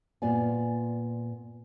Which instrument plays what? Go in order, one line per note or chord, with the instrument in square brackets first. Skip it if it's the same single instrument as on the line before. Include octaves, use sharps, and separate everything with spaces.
[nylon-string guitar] A#2 B3 F4 D5 F5 G#5